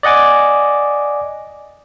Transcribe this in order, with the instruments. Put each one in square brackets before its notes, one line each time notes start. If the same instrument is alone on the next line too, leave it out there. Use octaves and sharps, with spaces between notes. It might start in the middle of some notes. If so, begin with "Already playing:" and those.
[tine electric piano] D5 D#5 F#5 G#5 D6